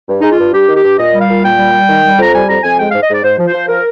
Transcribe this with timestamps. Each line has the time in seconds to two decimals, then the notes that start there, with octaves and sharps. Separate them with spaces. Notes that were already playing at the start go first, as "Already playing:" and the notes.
0.09 G2
0.21 G#3 D#4
0.31 F4
0.38 G2
0.53 G2 G4
0.68 D#3
0.75 G4
0.83 G2
0.98 A#2 D#5
1.13 G3
1.20 F5
1.28 A#2
1.43 A#2 G5
1.58 G3
1.73 G3
1.89 D#3
2.03 G3
2.18 F2 A#5
2.33 G3 G#5
2.49 F2 A#5
2.63 F2 G#5
2.79 G#3 G5
2.90 G#2 F5
3.01 D#5
3.09 G#2 D5
3.23 G#2 C5
3.38 F3
3.46 C5
3.53 F3
3.69 F3 A#4